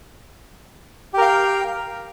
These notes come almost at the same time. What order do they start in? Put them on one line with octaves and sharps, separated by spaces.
G4 A#4 F5 G5